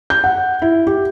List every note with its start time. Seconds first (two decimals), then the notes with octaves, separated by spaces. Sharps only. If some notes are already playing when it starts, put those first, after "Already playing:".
0.10 G6
0.24 F#5
0.62 E4
0.87 G4